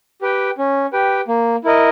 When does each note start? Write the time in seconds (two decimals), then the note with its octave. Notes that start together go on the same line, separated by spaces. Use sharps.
0.22 G4 B4 G5
0.58 C#4
0.93 G4 B4 G5
1.28 A#3
1.64 E4 A#4 D#5